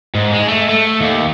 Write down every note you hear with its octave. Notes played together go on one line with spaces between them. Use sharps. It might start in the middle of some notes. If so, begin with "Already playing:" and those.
G#2
G#3
A3
A3
D#2